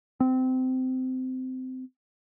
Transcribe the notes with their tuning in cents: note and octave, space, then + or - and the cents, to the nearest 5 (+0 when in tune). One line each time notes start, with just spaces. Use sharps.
C4 -20